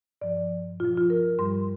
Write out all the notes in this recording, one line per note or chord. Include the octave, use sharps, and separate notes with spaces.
G2 F3 D5
A#2 F3 F4
F4
A#4
G2 G3 C6